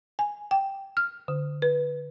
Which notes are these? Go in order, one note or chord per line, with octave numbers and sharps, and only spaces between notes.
G#5
G5
F6
D3
B4